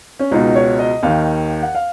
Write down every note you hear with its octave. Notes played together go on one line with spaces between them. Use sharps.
C#4
C#2 B2 D#4
C#5
D#5
D#2 D#3 F5
F#5
F5